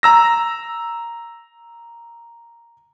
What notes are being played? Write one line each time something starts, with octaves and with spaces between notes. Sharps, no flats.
A#5 E6 A#6